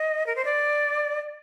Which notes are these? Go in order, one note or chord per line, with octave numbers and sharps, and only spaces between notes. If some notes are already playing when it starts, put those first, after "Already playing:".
Already playing: D#5
A#4
C5
D5